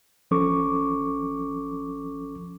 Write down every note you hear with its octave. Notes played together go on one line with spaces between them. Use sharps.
A1 F3 C#4 A4 C#6 D6